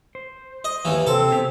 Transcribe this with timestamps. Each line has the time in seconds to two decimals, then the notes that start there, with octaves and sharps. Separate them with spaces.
0.15 C5
0.64 D#5
0.85 D#2 E3
1.07 C3 C4 A4
1.31 B3 G4 G#4